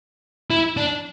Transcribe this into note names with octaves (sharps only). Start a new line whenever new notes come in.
E4
D4